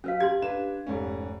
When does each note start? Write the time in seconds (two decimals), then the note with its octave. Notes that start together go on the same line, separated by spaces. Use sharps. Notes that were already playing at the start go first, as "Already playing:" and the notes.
0.04 F#3 C#4 B4 F5
0.20 G4 C6 G#6
0.42 D4 B4 E7
0.87 F1 G#2 C#4